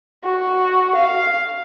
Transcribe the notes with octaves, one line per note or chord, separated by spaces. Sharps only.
F#4
F5